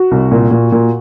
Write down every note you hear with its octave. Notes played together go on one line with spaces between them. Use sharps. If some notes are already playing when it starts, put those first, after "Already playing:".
Already playing: F#4
C2
A#2
A#2
A#2